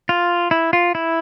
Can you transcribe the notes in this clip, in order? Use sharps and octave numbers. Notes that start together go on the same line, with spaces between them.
F4
E4
F4
E4